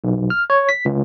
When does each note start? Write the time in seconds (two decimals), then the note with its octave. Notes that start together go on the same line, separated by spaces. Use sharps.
0.04 B1
0.30 F6
0.50 C#5
0.69 B6
0.85 C#2